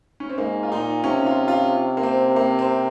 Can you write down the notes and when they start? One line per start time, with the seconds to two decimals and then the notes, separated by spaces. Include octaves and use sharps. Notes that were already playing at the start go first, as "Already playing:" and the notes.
0.20 C#4
0.30 C4
0.38 G#2 A#3
0.63 F4
0.72 A#2 D#4
1.04 C3 C#4
1.26 F4
1.48 F4
1.97 A#3
2.03 C4
2.36 A#3
2.59 C4